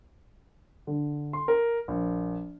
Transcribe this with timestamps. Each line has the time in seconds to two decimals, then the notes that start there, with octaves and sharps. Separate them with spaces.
0.87 D3
1.33 C6
1.48 A#4
1.88 A#1